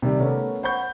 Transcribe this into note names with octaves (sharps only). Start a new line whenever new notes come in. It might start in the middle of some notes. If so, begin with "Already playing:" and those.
C3 D#3 G3 G4
A3 B3 C#4 A#4
C5 F#5 B5 C#6 G6